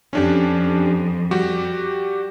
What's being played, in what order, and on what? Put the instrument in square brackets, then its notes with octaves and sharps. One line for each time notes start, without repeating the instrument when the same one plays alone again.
[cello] F2 [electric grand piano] C#4 D4 G4
[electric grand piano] G3 F#4 G4